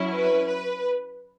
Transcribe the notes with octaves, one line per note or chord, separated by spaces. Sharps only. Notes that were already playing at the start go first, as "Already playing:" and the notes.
Already playing: F#3 C#4 E4
B4
B4